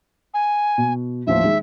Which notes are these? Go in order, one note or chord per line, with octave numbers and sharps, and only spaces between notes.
G#5
B2
A1 D#2 F3 E5
D#3 G#3